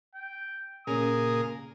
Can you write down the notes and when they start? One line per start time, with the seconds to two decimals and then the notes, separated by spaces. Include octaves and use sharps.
0.15 G5
0.87 A#2 C#3 G#4 A#4 D#6